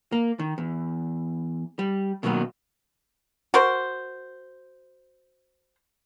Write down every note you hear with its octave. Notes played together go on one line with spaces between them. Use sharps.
A#3
D#3
E2
G3
B2 D#3 F#3 A#3 B3
F#4 A#4 C5